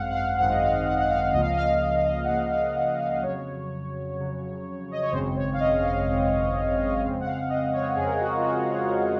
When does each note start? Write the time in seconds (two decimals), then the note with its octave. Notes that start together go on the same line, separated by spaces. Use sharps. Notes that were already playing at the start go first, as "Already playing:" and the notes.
Already playing: G#1 F#2 G#3 C4 F5 F#5
0.10 F#5
0.14 F5
0.38 G#1 F#2 D#3 G#3 C4 F#5
0.50 D#5
0.62 F5
0.85 F#5
0.99 F#5
1.09 F5
1.33 C#2 C#3 F3 A#3 D#5
1.41 F5
1.49 D#5
1.57 F5
1.96 F5
2.05 D#5
2.23 F#5
2.28 C#2 C#3 F3 A#3 F5
2.51 F5
2.74 F#5
2.99 F5
3.22 F2 C#3 F#3 C#5
4.17 F2 C#3 F#3
4.91 D#5
5.02 C#5
5.12 G#1 F#2 C#3 G#3 C4 C5
5.36 C#5
5.53 F5
5.60 D#5
5.84 F5
6.07 G#1 F#2 C#3 G#3 C4
7.02 F2 C#3 G#3 C4 F5
7.20 F#5
7.25 F5
7.49 D#5
7.73 C#5
7.96 F2 C#3 G#3 C4 G#4
8.05 A#4
8.13 G#4
8.20 F#4
8.35 F4
8.44 F#4